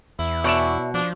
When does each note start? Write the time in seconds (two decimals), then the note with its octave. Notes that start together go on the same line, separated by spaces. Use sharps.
0.19 E2 E4
0.44 B2 C#5 D5 E5
0.94 F3 D4